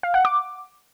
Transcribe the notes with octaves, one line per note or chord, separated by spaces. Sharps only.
F5
F#5
D6